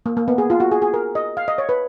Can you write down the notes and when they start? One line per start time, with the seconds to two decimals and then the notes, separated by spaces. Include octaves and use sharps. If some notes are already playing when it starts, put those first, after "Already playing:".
0.06 A#3
0.17 A#3
0.28 B3
0.38 G#4
0.50 F4
0.60 F#4
0.72 G#4
0.82 G#4
0.94 A#4
1.15 D#5
1.37 F5
1.48 D#5
1.58 C#5
1.69 B4